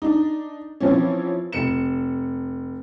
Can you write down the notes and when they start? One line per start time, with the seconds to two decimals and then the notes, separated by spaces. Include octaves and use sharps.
0.02 D4 D#4
0.81 E3 F3 C4 C#4
1.52 F1 C#7 E7